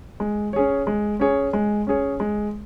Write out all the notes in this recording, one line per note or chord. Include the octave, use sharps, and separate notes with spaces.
G#3
C#4 G#4 C#5
G#3
C#4 G#4 C#5
G#3
C#4 G#4 C#5
G#3